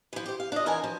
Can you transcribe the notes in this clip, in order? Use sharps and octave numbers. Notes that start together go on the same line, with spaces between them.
E3 F3
G4 C5
F5
D4 F4 D#5
D3 E3 A#4 C#5 G#5 A5
F3